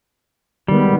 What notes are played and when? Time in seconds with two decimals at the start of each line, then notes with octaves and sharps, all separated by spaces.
0.68 D#3 G3 G#3 B3